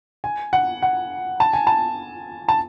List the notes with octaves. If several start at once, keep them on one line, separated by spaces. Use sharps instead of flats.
G#5
F#5
F#5
A5
G#5
A5
A5